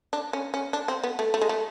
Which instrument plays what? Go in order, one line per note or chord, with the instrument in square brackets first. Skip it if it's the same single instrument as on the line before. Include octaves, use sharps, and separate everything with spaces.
[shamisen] D4
C#4
C#4
D4
C4
B3
A3
A3
G#3
A3